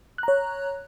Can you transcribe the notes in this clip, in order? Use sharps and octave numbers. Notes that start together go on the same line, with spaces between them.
C#5 A#5 F#6